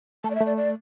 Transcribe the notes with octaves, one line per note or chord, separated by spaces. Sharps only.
A3 A5
D5
E5
A3
D5
D5